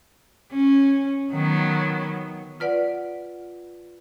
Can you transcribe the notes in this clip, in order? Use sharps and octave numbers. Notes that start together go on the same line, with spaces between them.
C#4
D#3 F#3 B3
F4 B4 D5 F#5